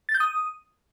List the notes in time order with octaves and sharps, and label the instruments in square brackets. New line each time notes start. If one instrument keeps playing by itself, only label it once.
[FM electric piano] A6
G6
D#6